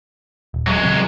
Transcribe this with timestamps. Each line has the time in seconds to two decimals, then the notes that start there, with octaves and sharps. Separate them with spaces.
0.54 D#1
0.67 F#3 G#3
0.83 C#3 C4